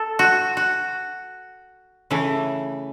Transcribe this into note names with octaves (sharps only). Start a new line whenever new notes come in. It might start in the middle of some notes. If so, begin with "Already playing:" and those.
Already playing: A4
F#4
F#4
C#3 E3 A3